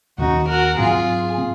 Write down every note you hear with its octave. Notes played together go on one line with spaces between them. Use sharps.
D#2 D#3 A#3 C#4 D#4 F#4
F#4 A#4
G#2 F#3 C4 F4 G#4
C4